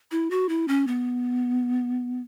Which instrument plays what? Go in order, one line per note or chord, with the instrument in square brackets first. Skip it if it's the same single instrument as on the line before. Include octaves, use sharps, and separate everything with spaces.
[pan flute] E4
F#4
E4
C#4
B3